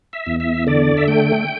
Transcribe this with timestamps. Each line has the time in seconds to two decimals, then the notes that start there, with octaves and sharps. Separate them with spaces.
0.13 E5
0.26 E2
0.40 E5
0.67 D3 D5
0.97 E5
1.08 A3 G5